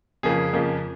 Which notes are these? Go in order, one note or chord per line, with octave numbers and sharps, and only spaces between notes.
F2 C#3 F3 A#3 G#4
F2 C#3 F3 A#3